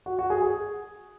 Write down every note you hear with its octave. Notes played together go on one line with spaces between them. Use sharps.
F#4
F#4
G#4
G#4